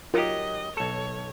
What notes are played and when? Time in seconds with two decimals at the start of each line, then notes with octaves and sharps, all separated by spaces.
0.14 F#3 D#4 F4 G4 A#4 D#5 D#6
0.77 B1 A4 C#5 C#7